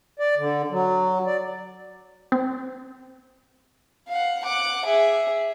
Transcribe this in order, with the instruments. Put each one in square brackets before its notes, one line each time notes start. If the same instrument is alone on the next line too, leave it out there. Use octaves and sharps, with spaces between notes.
[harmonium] D5
D3
F#3
D5
[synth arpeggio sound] C4
[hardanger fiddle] F5 F#5
F#5 D6
G#4 E5